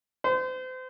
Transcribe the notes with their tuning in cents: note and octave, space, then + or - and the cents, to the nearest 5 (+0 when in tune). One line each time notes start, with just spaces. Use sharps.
C5 -35